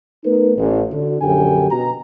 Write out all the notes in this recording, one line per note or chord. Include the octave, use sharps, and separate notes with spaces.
A3 B3 D#4 A#4 B4
A1
D3 F#4
A#1 F#2 D3 G4 G5 G#5
B2 F#4 A#5